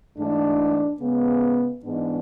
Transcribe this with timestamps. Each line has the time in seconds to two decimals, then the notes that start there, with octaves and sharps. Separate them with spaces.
0.18 G#2 E3 A3 D4
1.01 C#3 G#3 B3
1.83 G#2 E3 G#3 B3 D4